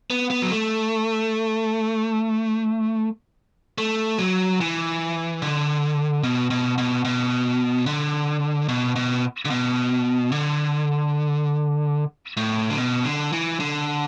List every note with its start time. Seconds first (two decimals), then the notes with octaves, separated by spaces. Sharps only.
0.10 B3
0.30 B3
0.42 F#3
0.51 A3
3.78 A3
4.18 F#3
4.60 E3
5.42 D3
6.24 B2
6.51 B2
6.78 B2
7.05 B2
7.86 D3
8.69 B2
8.96 B2
9.45 D3
9.50 B2
10.32 D3
12.37 A2
12.70 D3
12.78 B2
13.05 D3
13.33 E3
13.60 D3